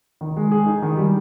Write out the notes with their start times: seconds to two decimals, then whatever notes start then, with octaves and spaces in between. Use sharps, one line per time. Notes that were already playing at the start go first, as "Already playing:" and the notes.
0.21 D#3
0.37 G#3
0.51 G#4
0.66 D#4
0.82 D#3
0.97 G3